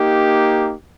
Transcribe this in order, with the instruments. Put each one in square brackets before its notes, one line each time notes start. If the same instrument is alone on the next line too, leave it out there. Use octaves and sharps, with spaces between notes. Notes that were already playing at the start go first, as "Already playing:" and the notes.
Already playing: [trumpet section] A#3 D#4 G4